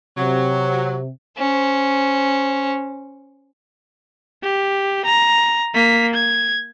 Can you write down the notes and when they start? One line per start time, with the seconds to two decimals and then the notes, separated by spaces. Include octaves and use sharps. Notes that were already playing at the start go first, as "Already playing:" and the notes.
0.17 C3 F#3
1.38 C#4 C5
4.43 G4
5.05 A#5
5.75 A#3 B6
6.14 G#6